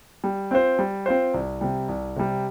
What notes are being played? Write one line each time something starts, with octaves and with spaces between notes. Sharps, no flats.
G3
C4 F4 C5
G3
C4 F4 C5
C2
C3 G3
C2
C3 G3